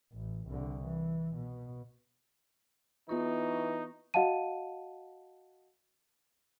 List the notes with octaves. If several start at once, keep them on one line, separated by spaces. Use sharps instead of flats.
A1
C2 D3
E3
B2
E3 B3 D#4 F4 C#6
F#4 D#5 F5 F#5 A5 D#7